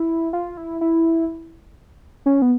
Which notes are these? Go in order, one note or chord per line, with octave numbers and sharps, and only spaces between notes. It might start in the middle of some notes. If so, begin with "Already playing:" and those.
Already playing: E4
F4
E4
E4
C#4
B3